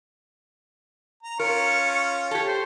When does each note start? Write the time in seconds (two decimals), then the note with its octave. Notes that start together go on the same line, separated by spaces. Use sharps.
1.23 A#5
1.40 C#4 F4 A#4 C#6
2.31 G4 A4 C#5
2.47 C5